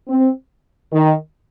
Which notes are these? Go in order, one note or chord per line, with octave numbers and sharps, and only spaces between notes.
C4
D#3